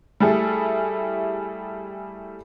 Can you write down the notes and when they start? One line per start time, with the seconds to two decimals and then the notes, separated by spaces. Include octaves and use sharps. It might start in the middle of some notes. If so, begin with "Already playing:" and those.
0.20 G3 A3 E4 G#4 A4